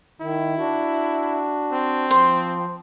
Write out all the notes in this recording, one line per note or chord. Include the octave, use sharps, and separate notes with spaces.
D#3 E4
D4 F#4
C4
F3 C5